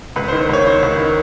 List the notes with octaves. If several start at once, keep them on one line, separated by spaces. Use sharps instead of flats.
C#2 B4
C5
D#3
C5
C#2 C#5
D#3 C5
C#2
D#3